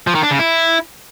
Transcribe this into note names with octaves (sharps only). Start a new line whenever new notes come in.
F3
D#3
D4
C#3
E4